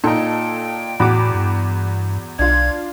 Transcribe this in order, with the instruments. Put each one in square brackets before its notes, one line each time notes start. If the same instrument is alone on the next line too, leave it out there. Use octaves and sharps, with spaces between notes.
[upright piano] A#2 D#4 [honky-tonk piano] A4 [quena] G5
[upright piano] E2 F#4 [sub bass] A2 [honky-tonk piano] B5 D6
[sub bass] G2
[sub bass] B1 [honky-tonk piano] D4 F4 [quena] G#6